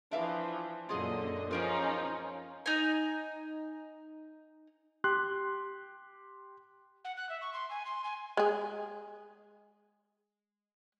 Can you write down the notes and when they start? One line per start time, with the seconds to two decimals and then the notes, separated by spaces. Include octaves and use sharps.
0.11 E3 F3 D4 E5 F5
0.89 F#2 A#2 D3 F4 G#4 D#5 F#5
1.51 F3 C#4 D#4 F4 G#4 A#4 C5
2.66 D#4 G#5
5.04 G4 C6 F#6
7.04 F#5
7.16 F#6
7.29 E5
7.41 C#6
7.53 C6
7.70 G#5
7.85 C6
8.04 G#5
8.37 G#3 G#4